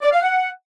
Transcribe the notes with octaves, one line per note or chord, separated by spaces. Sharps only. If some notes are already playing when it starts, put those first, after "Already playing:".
D5
F5
F#5